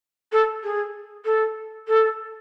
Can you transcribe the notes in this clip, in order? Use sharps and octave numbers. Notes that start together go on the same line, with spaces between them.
A4
G#4
A4
A4